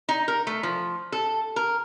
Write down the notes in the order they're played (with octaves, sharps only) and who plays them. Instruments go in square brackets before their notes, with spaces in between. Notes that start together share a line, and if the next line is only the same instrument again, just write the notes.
[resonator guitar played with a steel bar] D#4
A#4
A3
F3
A4
A#4